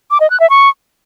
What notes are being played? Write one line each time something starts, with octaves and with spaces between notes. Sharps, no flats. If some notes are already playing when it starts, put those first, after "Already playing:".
D6
D#5
F#6
E5
C#6